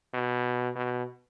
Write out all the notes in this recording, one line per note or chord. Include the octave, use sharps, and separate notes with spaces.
B2
B2